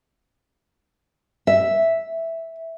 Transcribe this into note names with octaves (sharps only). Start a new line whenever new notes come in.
E5